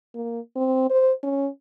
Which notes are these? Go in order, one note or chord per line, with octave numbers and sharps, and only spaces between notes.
A#3
C4
C5
C#4